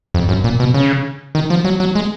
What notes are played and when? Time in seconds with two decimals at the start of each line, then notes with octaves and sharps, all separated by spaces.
0.14 F2
0.29 F#2
0.44 A#2
0.60 B2
0.74 C#3
1.35 D#3
1.50 F3
1.65 F#3
1.80 F#3
1.95 G#3